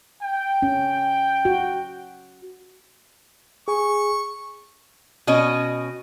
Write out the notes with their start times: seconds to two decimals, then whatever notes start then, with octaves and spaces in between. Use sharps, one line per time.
0.23 G5
0.62 C#4
1.45 F#4
3.68 G#4 G#5 C#6
5.27 B2 C#4 D#5